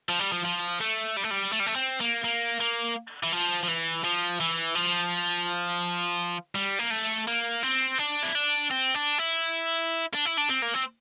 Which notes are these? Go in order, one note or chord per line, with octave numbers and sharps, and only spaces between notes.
F3
G3
F3
F3
A3
G3
A3
G3
A3
G3
A3
C4
A#3
A#3
A#3
E3
F3
F3
E3
F3
E3
F3
G3
A#3
A3
A#3
C4
D4
E4
D4
C4
D4
E4
D4
E4
D4
C4
A#3
C4